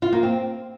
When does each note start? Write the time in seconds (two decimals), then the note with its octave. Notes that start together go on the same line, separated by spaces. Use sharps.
0.02 F4
0.13 A#3
0.23 C4